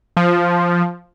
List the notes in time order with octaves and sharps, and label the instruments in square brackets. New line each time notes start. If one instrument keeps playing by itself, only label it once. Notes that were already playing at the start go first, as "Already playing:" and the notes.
[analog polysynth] F3